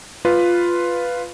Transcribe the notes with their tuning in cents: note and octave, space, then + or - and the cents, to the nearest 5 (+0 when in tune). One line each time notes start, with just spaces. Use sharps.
F4 +0 B4 +5